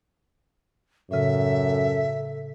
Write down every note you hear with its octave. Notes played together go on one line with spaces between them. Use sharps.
F#2 A2 C#3 A4 E5